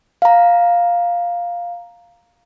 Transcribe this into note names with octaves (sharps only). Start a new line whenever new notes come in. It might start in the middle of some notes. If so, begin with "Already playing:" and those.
F5 A#5